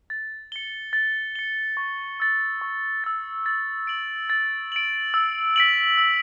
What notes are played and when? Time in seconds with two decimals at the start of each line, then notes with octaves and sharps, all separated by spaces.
0.10 A6
0.52 C#7 G7
0.93 A6
1.35 C#7 G7
1.77 C#6
2.20 E6 A6
2.61 C#6
3.04 E6 A6
3.46 A6
3.87 D7 F#7
4.30 A6
4.72 D7 F#7
5.14 E6
5.56 B6 D7 F#7
5.98 E6